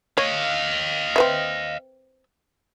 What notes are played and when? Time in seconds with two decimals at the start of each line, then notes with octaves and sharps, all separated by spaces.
0.17 C#5 D#5 F5
1.16 C4 B4 E5